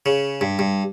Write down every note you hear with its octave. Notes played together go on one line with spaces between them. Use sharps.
C#3
G2
G2